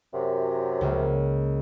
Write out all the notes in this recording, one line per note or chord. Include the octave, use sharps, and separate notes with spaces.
F#2 C3
C#2 A#3